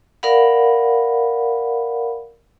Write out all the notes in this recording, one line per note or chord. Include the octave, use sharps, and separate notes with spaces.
A#4 D5 F5 F#5 B5